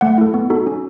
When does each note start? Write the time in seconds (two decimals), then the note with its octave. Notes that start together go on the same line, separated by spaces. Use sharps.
0.01 A3 F#5
0.18 E4 A4
0.34 B3
0.50 D#4 F#4 A4
0.67 C#4